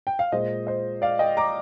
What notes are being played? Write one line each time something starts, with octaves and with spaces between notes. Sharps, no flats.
G5
F5
A#2 G#3 C5 D#5
C5 D#5
D5 F5
D#5 G5
A#5 D6